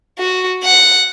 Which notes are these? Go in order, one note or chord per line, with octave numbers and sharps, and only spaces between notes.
F#4
F#5